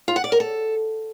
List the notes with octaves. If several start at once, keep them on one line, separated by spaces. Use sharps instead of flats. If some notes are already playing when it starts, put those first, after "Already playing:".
F4
F#5
D5
A#4
A4